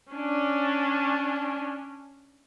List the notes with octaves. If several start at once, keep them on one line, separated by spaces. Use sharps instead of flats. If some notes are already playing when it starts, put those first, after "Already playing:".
C#4 D4